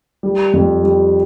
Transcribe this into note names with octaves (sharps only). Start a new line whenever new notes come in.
G3
F2
G3